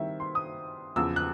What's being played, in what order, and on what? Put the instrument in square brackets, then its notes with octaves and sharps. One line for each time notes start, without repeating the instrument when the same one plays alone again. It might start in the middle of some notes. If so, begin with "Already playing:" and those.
Already playing: [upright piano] D#3 G3 C4 E4 E5
C6
D#6
E2 C#3 F3 E6
F#6